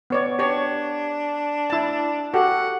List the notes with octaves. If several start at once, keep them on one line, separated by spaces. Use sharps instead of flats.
B3 C#5 D5
D4 G4 C#5
E4 A5
F#4 G4 A4 F#5